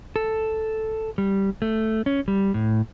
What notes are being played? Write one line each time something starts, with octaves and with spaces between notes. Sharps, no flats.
A4
G3
A3
C#4
G3
A2